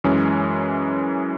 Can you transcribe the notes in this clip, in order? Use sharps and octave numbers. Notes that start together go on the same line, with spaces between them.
F#2 E3 G#3 C#4